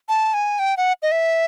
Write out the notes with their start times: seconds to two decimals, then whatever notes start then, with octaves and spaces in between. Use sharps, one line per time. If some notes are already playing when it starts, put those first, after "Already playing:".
0.09 A5
0.34 G#5
0.59 G5
0.77 F#5
1.02 D#5
1.12 E5